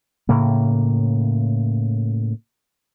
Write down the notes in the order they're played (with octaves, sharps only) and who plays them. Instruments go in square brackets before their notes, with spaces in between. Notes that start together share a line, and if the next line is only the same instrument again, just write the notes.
[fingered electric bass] A2 C#3 A#3